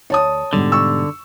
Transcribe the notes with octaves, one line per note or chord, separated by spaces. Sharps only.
D2 C#5 A5 D#6
G#2 B2 D3 G3
C#6 E6